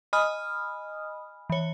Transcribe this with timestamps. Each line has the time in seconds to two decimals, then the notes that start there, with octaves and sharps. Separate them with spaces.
0.13 D#5 G#5 B5 D#6 F6
1.50 E3 C#5